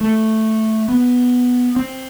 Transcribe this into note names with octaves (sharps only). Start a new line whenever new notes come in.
A3
B3
C4